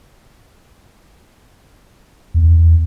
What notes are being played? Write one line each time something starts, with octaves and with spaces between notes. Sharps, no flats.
E2